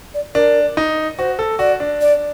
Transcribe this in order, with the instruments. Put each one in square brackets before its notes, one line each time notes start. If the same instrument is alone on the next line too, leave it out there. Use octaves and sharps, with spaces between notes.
[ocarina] D5
[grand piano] D4 [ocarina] A#4
[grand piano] D#4
[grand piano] F#4 [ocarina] C5
[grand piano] A4
[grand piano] F#4 [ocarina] D5
[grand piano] D4
[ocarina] D5